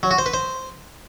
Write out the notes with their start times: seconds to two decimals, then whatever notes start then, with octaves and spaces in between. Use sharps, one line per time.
0.03 F#3
0.11 F#4
0.18 C5
0.26 B4
0.34 C5